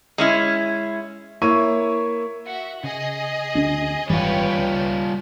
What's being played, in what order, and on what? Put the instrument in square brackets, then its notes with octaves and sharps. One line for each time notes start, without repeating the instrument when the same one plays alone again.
[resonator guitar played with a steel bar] G#3 C#4 E4
[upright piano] A#3 E4 C#5 E5 C#6 D#7
[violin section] F#4 E5
[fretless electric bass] C#3 [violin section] G#4 D#5
[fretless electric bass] D2 C#4 D4
[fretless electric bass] G#1 F#2 E3 [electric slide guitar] G3 F4 [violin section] B4 C#5 G5
[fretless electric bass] C#2